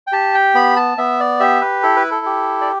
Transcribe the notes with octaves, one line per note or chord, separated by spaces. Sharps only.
G5
G4 A5
G5
B3 B5
A5
B3 E5
D5
G4 E5
B4
E4 A4
B4
A4
G4
D5